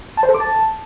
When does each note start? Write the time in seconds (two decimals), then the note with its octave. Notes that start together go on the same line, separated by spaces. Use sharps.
0.17 A5
0.23 C5
0.29 A4
0.34 D6
0.40 A5